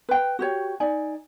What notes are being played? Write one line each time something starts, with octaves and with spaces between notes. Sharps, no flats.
B4 G5
F#4 G4 C#5
D#4 D5 G#5